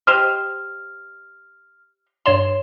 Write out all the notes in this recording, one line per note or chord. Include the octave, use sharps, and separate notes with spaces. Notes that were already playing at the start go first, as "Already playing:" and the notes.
G4 C5 D#5 F6
G2 C#5 C6 E7